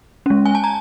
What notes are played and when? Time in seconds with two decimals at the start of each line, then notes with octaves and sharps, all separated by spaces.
0.26 G#3 C#4
0.46 G#5
0.55 A5
0.64 A#5